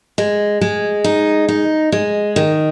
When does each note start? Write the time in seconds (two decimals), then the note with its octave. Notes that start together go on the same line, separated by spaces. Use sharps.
0.18 G#3
0.61 G#3
1.04 D#4
1.49 D#4
1.92 G#3
2.36 D#3